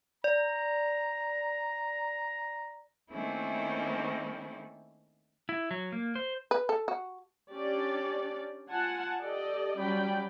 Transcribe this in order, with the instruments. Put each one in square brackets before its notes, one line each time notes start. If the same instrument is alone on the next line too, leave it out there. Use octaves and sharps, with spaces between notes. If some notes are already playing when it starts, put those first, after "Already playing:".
[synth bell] D5 [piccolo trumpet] A#5
[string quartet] D#3 A3 A#3 C4 C#4 E4
[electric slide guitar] E4
F#3
A#3
C5
[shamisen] B4
A4
F#4
[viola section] C#4 D4 G4 D5
F4 F#5 G#5 A5
G4 A4 D5 D#5
F#3 G3 C#4 D5 G5 B5